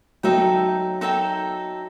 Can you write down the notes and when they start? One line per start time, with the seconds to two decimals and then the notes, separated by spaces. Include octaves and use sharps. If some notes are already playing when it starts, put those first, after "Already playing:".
0.23 F#3 D#4 A4 E5 G5
1.01 D#4 A4 E5 G5